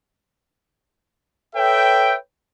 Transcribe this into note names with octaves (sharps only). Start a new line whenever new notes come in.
A4 B4 C#5 E5 G5